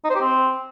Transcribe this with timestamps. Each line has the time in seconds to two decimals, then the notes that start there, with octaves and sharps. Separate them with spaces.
0.04 D#4
0.10 C5
0.15 G4
0.21 C4